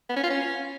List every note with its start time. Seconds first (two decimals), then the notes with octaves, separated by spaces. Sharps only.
0.09 B3
0.16 C#4
0.23 F4
0.30 C#4